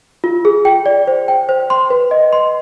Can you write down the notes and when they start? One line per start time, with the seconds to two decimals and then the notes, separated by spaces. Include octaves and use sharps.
0.24 F4
0.45 G#4
0.65 G5
0.86 D5
1.07 C5
1.28 G5
1.49 C5
1.70 C6
1.90 B4
2.11 D#5
2.33 C6